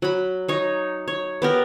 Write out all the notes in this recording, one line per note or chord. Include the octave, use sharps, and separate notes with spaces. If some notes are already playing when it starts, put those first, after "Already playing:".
F#3 B5
D#4 C#5
C#5
B3 G4 A#4